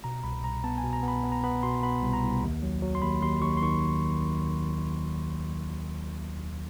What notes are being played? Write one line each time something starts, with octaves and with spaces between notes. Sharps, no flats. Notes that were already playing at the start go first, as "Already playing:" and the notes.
B2 A#5
C2 B5
C2 A#5
B3 A5
G#5
B2
A#5
B3 B5
B3
A#5
B3 B5
B2 C6
B3 B5
C2
A#5
C2
D#2
F#3
F#3
C6
D#2 B5
D#2 C6
D#2 C#6
C6
D#3 C#6